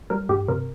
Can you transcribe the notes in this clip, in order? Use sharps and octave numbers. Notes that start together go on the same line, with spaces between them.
G3 A#4
G2 G4
C3 A#4